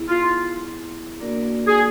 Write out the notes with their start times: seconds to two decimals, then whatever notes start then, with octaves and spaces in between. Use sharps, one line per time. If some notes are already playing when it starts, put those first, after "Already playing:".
Already playing: B3 E4 G#4
0.09 F4
1.20 A#3 D4 F#4 A#4 D5
1.67 G#4